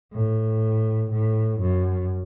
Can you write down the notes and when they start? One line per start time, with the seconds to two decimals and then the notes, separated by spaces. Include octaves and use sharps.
0.13 A2
1.11 A2
1.61 F#2